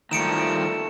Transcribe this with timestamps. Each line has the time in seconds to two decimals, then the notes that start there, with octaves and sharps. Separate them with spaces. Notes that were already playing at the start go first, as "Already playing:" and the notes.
0.11 D#3 F3 G3 A3 C#7 D7 E7